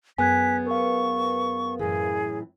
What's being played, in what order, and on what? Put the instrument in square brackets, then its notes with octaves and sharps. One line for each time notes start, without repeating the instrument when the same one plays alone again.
[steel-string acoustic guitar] F#2 B3 G#4 [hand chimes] G#5 F#6 G#6 [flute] B6
[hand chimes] A#4 B4 F5 [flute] C#6
[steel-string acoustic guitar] F#2 A2 E3 [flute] G#4